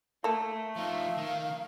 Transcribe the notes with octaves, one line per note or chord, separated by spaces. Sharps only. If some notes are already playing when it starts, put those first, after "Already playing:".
A3 A#3 A4
F3 D#4 F5
D#3